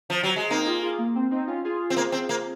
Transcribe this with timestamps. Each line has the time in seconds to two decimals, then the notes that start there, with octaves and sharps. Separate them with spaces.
0.10 F3
0.23 F#3
0.36 G#3
0.50 A#3 C4 D#4
0.66 F4 G#4
0.82 F4 G#4
0.98 A#3
1.15 C4
1.31 C4 D#4
1.47 C#4 F4
1.65 F4 G#4
1.90 C4
1.96 A#3
2.12 C4
2.29 A#3